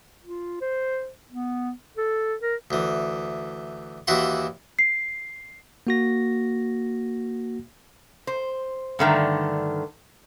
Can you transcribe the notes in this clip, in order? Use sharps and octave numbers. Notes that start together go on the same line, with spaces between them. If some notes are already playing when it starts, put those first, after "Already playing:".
F4
C5
B3
A4
A#4
D2 E3
D#2 E3 E4 F#4 C6
C7
A#3 F#4 A#6
C5
G2 D3 D#3 A3